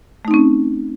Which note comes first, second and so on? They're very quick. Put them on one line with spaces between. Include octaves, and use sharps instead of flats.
A3 D#4 C4 C#4